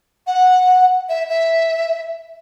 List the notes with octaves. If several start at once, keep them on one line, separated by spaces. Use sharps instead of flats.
F#5
E5
E5